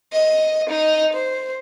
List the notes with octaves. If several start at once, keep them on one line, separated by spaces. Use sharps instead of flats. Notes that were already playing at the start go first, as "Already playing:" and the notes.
D#5
D#4 D#5
C5